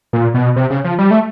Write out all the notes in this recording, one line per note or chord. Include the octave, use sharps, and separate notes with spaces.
A#2
B2
C3
C#3
F3
G3
A3